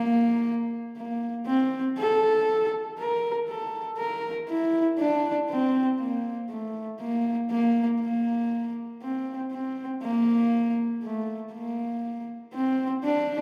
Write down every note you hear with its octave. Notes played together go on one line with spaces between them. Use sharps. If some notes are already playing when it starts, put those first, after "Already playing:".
Already playing: A#3
A#3
C4
A4
A#4
A4
A#4
E4
D4
C4
A#3
A3
A#3
A#3
A#3
C4
C4
A#3
A3
A#3
C4
D4